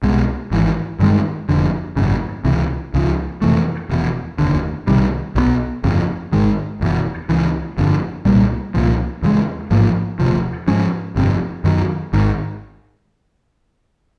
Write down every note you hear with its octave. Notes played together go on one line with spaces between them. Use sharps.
C2 B2 G#3
G#1 G#2 E3
G2 D#3 G#3
F1 F2 D3
G#1 F#2 C#3
C#2 C3 E3
C#2 C#3 F3
F2 C3 E3 A3
F1 E2 B2
F1 D#2 D3
C2 C3 D#3 G3
B1 B2 G3 B3
G1 F2 C#3
G#1 G#2 D#3 G#3
F#1 E2 B2
C#2 C#3 E3
G1 F2 D3
C2 A#2 G3 A#3
C2 A#2 F3
E2 C#3 F3 G#3
A1 G#2 F3 A#3
E1 D2 C3 F3
G#2 F3 G#3 C#4
G1 F2 C3
F#2 D#3 F#3
G#1 G#2 D#3